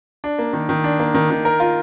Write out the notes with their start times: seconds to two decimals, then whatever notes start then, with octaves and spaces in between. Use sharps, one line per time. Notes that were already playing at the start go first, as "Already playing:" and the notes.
0.24 D4
0.39 A#3
0.53 D#3
0.69 D#3
0.84 D4
0.99 A#3
1.14 D#3
1.30 D#3
1.45 A#4
1.60 F4